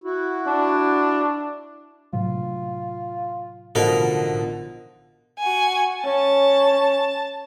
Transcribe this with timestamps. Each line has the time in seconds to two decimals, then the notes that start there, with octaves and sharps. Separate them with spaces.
0.04 E4 F#4
0.47 D4
2.13 A2 C3 F#3 F4
3.75 A1 B2 D3 F3 D#4 A#4
5.39 F#4 G#5
6.04 C#4 A5